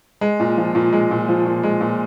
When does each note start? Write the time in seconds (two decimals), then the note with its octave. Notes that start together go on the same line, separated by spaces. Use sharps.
0.21 G#3
0.40 A#2
0.57 F3
0.75 A#2
0.93 G#3
1.11 A#2
1.28 F3
1.45 A#2
1.63 G#3
1.81 A#2